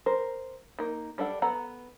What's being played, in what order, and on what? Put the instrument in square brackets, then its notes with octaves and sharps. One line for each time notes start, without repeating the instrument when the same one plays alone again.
[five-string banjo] A#4 C5
A#3 D#4
G3 D4 A4 F#5
B3 A4 F#5 A#5